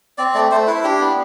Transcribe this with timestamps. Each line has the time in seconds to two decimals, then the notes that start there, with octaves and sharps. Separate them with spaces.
0.18 C4 D5
0.35 A3 D5
0.51 A3 C5
0.67 E4 B4
0.84 D4 G4
1.01 B3